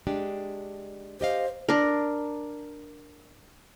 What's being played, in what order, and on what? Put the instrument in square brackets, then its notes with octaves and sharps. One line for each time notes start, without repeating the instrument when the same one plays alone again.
[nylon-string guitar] G#3 D4 G4
[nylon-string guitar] G4 D#5 F5 [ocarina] C5
[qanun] D4 A#4